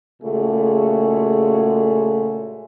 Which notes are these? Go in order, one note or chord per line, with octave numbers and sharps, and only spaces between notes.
A#2 C#3 G#3 A3 F#4 G#4